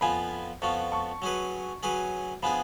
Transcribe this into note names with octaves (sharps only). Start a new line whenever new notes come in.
F2 F3 B3 F4 G#5 B5
F2 F3 B3 F4 A5 C#6
A5 C#6
F#3 C#4 G#4 B4
F#3 C#4 G#4 B4
F3 B3 D4 G#4 G#5 B5